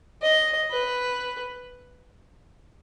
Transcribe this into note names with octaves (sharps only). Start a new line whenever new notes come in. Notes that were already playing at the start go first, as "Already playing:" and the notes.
D#5
B4